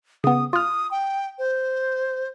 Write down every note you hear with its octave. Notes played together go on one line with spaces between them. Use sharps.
C#3 B3 D#6
F4 D#6 F6
G5
C5